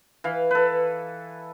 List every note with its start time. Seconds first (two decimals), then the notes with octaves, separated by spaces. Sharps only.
0.24 E3 F5
0.51 A4 B4